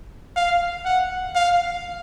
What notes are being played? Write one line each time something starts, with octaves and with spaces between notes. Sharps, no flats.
F5
F#5
F5